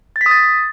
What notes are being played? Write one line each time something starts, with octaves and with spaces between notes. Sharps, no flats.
A6
B6
D#6
A6